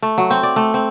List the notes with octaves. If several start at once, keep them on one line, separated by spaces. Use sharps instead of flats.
A3
F#3
C4
D5
A3
C4